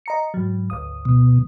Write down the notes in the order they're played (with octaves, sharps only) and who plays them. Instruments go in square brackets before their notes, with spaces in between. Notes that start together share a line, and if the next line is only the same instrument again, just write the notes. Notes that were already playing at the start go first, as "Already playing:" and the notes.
[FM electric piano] D#5 A#5 C#7
G#2 F#3
G#1 D2 D#6
[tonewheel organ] B2